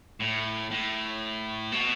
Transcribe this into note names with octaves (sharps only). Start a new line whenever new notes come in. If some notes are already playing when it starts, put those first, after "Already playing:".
A2
A2
B2